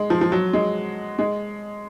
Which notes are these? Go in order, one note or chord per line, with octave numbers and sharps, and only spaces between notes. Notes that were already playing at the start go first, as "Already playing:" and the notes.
Already playing: G#3
F3
F3
F#3
G#3
G#3